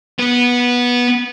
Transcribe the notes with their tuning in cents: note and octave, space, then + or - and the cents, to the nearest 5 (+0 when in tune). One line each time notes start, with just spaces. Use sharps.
B3 -15